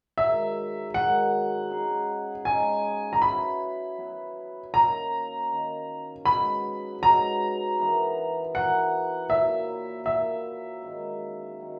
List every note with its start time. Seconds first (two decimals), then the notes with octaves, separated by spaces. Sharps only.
0.18 G#2 D#3 F#3 E5
0.94 G#2 D#3 F#3 F#5
1.70 C#3 G#3 D#4 G#4
2.45 C#3 G#3 D#4 G#4 G#5
3.13 A#5
3.22 F#3 B3 E4 B5
3.97 F#3 B3 E4
4.74 D#3 A#3 C#4 A#5
5.50 D#3 A#3 C#4
6.25 G#2 F#3 B3 B5
7.02 G#2 F#3 B3 A#5
7.78 E3 B3 F#4 A#4
8.54 E3 B3 F#4 A#4 F#5
9.30 A#2 F#3 A#3 E4 E5
10.06 A#2 F#3 A#3 E4 E5
10.82 G#2 D#3 F#3 C#4
11.60 D#3 F#3 C#4